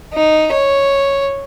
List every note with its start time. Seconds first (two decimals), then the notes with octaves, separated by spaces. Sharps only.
0.14 D#4
0.53 C#5